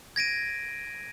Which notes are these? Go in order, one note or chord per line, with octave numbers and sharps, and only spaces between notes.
G#6 A#6 D7 D#7